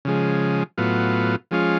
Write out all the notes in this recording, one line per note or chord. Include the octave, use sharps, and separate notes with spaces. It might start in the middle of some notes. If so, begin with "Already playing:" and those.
C#3 F3 G#3
A2 F#3 B3 F4
F3 G#3 C#4 F4